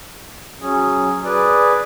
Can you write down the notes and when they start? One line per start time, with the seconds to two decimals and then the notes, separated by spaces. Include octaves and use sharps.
0.62 F#3 C#4 G#4
1.24 G#4 B4 D5